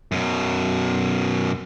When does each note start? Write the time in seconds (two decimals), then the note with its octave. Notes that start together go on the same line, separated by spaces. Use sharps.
0.12 F#2 B2